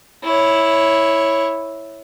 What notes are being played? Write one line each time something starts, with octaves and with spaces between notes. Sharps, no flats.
E4 C#5